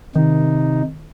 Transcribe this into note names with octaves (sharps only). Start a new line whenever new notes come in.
C3 D#3 D#4